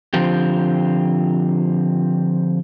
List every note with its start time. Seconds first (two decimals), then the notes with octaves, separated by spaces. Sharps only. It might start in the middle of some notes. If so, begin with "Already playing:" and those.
0.14 D3 F3 C4 F4 G4